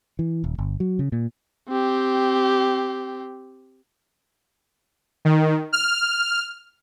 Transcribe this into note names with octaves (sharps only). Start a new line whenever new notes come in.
E3
D#1
G1
F#3
C#3
A#2
C4 G4
D#3
F6